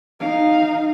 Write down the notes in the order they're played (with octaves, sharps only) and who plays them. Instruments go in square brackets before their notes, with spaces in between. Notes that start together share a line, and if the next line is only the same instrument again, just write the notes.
[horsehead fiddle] D#4 F5